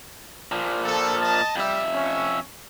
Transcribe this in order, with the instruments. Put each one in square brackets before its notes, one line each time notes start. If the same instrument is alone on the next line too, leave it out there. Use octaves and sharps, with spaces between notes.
[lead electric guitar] A#2 F3
[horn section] A4
D#5 A5
[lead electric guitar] F2 E5 [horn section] G3
[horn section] C#4